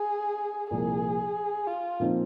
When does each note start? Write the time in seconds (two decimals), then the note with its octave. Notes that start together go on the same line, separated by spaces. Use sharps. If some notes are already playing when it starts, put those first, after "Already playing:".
Already playing: G#4
0.70 C2 A#2 F3 G#4
1.67 F4
2.00 A#2 F3 C4 D#4